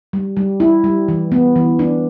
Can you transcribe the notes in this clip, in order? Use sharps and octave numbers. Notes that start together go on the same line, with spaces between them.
G3
G3
E4
G3
E3
B3
E3
D4